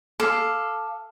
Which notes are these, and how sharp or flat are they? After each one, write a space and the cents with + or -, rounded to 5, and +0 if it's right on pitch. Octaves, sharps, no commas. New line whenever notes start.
A4 +0 F5 +0 D6 +10